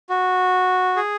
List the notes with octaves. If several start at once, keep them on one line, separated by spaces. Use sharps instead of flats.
F#4
G#4